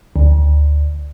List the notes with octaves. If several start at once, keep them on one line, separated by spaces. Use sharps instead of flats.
D2